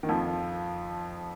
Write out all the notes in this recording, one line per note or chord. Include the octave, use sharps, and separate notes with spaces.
D#3
F2 F3